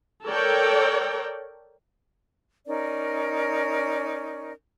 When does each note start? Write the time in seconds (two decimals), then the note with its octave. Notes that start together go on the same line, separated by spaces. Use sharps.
0.26 A4 A#4 C#5 D5 G5
2.66 C#4 D#4 A#4 D5